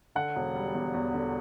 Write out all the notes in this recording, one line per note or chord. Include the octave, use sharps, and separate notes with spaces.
D3 F#5
E1
G3
E2
E2
D3